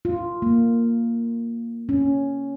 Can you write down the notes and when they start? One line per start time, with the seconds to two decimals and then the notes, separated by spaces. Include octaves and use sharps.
0.05 F4
0.42 A#3
1.89 C#4